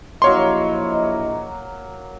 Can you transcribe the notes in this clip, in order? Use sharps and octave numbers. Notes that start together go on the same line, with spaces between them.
A#1 F#3 A#3 E4 C#5 D#5 C6 C#6